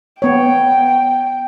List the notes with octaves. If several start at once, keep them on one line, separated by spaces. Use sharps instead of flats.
B3 C#5 G5